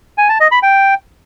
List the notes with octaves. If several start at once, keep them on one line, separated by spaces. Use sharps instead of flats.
G#5
A5
D#5
B5
G5